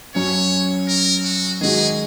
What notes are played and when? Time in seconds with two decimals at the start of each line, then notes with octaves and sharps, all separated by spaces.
0.15 F#2 F#3 C#4 C#5
0.89 A#4
1.24 F#4
1.61 D#3 G#3 F#4 G#4